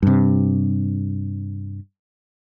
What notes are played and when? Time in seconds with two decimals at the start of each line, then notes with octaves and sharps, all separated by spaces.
0.03 G2 C3